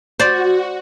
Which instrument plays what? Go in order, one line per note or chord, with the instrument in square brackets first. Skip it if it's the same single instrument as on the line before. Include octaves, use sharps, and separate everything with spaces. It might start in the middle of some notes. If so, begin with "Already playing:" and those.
[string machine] F#4 [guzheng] C5 D5